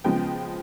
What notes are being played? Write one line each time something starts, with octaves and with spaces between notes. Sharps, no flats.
C#3 F3 G#3 B3 G5